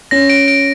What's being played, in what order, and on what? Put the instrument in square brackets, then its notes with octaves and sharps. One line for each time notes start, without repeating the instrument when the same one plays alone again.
[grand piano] C#4 [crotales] A#6
[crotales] D7
D7